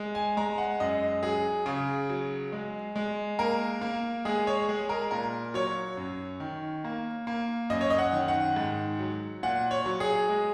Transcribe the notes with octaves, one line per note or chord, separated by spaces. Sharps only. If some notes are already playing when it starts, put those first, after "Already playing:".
Already playing: G#3
G#5
G#3 A#5
F#5
F#2 D#5
F#3 G#4
C#3
F#3
G#3
G#3
A#3 A#4
A#3
G#3 G#4
C#5
G#3 G#4
A#4
A#2 A#4
F#3 C#5
F#2
D#3
A#3
A#3
F#2 D#5
C#5
D#5
F#5
D#3
F#5
G#2
F#3
A#2 F#5
C#5
F#3
G#4
G#3